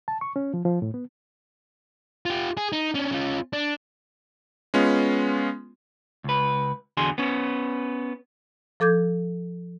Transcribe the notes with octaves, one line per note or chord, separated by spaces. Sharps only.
A5
C#6
C#4
F3
F3
A2
B3
F4 G4
G#4
D#4
C#4 D4
C#4 F4
D4
G#3 B3 C#4 F4
C#2 B4
E2 D3 F#4 G#4 C6
B3 C#4
F3 A4 D6 G6 G#6